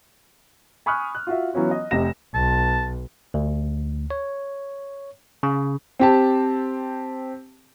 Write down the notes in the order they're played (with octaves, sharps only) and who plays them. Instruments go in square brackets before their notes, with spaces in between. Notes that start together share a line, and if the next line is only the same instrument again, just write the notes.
[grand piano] G#5 B5 C#6 D#6 F6 F#6
F#6
F4 F#4 E5
E3 F#3 B3 C#4 F4
D#5
F1 C3 D#5 A#6 E7
[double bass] B1 [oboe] A5
[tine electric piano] D2
C#5
C#3
[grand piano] C4 G4 A5